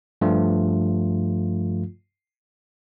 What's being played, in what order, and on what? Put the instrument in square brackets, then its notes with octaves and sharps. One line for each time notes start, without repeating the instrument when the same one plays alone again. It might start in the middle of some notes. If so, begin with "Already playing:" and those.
[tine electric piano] G2 F3 A3 F4